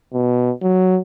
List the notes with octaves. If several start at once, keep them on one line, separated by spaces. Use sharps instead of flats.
B2
F#3